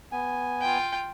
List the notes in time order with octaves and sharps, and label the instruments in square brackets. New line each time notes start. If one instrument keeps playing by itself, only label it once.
[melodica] B3 G#5
[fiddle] F4 G5